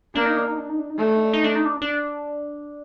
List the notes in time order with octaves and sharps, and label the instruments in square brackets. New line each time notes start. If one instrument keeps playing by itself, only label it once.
[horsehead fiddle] A#3 [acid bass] D4
[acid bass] D#4
D4
D#4
D4
D#4
D4
D#4
[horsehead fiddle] A3 [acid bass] D4
[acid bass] D#4
D4
D#4
D4
D#4
D4
D4